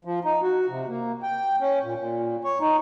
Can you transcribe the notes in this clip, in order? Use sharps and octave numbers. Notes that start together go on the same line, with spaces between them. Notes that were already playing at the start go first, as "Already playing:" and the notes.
F3
D#4
F#4
C3
A#3
G5
C#4
A#2
A#2
C#5
D#4